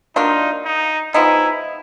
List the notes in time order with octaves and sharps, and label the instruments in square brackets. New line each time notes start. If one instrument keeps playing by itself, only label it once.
[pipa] F#3 A#3 D4 F4 [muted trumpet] D#4
[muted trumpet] D#4
[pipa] F3 G#3 B3 D#4 [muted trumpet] E4